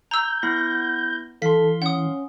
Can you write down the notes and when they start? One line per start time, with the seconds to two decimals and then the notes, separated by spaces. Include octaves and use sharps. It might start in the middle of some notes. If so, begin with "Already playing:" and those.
0.11 A#5 E6 G6
0.43 B3 E4 A#6
1.42 E3 A4 F5 C6 B6
1.82 C#4 F#5 D#6